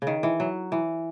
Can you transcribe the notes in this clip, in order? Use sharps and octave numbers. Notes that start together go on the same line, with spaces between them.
C#3
D#3
E3
F#3
E3